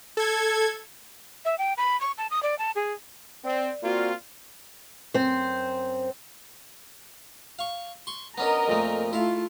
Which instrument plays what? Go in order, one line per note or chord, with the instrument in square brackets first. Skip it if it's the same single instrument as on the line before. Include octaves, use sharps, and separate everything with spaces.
[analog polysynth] A4 G#6
[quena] E5
G5
B5
C#6
A5
D#6
D5
A5
G#4
[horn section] C4 [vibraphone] D5
[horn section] A#3 C4 F4 [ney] F#4
[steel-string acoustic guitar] F#2 C4 C5
[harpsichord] F5 C#6
C6 C#6
[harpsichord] B3 C#4 D4 [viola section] A#4 D#5 A#5
[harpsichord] F2 A#2 A3
[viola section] A3 F4 [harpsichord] E4 F5